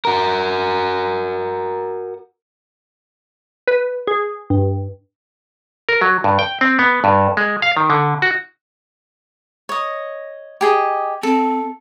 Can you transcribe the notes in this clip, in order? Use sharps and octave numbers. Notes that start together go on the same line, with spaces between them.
F#4 A#4
B4
G#4
G2
A#4
F#3
G2
G5
C4
B3
G2
G#3
F5
D#3
D3
F#4
C#5 D#5
G4 G#4 D#5
C4 A4